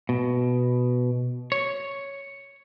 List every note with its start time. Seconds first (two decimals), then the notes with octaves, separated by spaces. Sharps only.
0.09 B2
1.52 C#5